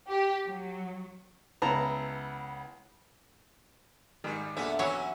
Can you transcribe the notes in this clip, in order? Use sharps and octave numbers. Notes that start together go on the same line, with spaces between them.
G4
F#3
C#2 B3 E4 A5 A#5
G#2 D#3 G3
E2 A#2 D3 A3 B3 E5
E3 F#3 C#4 E4 F#4 C#5